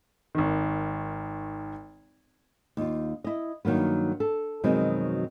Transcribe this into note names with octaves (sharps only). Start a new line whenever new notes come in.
G#1 D#3
D#2 F4
E4 D#5
G2 D#3 F#3 A#3 B3
A4
F2 B2 D#3 F#3 G#3 C4